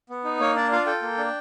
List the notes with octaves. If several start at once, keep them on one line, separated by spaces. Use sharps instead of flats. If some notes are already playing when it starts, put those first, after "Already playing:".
B3
D#4
A#3 C#5
D4 D5
F4 F5
A4 G5
A#3
D4